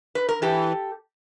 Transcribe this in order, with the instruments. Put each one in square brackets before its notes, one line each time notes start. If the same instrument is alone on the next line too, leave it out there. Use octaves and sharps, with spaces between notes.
[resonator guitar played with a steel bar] B4
A#4
[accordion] E3 [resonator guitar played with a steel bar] G4 A4